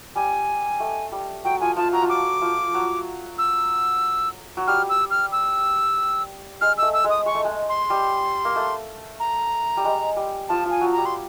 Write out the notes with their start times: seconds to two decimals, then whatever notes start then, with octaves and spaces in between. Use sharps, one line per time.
0.15 G3 G#5
0.80 A3
1.12 G3
1.45 F#3 G5
1.60 F3 G#5
1.76 F3 A5
1.93 F#3 A#5
2.02 F3
2.09 F#3 D6
2.42 F3
2.74 F#3
3.38 E6
4.57 F#3
4.67 G3 F6
4.89 E6
5.11 F6
5.32 E6
6.61 G#3 F6
6.78 A3 E6
6.93 E6
7.04 G#3
7.10 D#6
7.26 G#3 C#6
7.35 A3
7.45 G#3
7.69 C6
7.90 G3
8.45 A#3
8.56 A3
9.20 A#5
9.77 G3
9.84 G#3
10.16 G3
10.49 F3 A5
10.65 F3
10.71 G#5
10.81 F#3
10.92 A#5
10.98 G3
11.06 C6